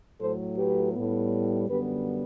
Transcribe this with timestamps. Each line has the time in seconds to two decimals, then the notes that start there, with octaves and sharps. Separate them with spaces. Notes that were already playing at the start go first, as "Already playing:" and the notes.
0.20 A2 F#3 A3 A4 C5
0.57 G4 B4
0.94 A2 G3 B3
1.68 F#2 D3 G3 B3 G4 B4